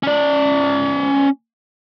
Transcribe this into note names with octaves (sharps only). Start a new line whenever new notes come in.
C#4 D5